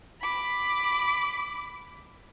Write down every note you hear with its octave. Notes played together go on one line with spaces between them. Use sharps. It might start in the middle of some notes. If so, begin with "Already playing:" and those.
B5 D6